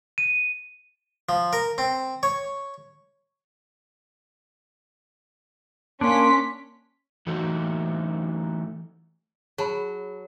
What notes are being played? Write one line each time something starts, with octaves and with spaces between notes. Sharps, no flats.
D#7
F3
A#4
C4
C#5
A#3 C#4 D4 C6 B6
E3 F#3 A3 D#4 F#4
F#3 G#4 A5 B5